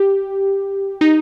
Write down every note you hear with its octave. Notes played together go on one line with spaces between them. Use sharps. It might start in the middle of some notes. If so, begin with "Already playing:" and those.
Already playing: G4
D#4